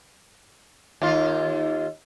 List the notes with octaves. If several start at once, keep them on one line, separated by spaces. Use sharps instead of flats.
D#2 F4